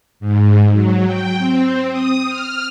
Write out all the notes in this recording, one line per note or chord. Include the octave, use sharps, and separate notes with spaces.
G#2
F#3
G5
C4
D#6
F6